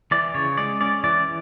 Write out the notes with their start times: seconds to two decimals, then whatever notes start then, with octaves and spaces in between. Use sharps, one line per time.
0.11 E3 D5
0.34 C#3 C#5
0.57 G#3 D5
0.81 C#4 D5
1.04 E3 D5